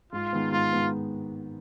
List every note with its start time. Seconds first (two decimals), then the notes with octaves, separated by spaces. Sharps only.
0.13 G#2 F4
0.33 D#3 G#3 B3
0.52 G#2 F4
0.73 D#3 G#3 B3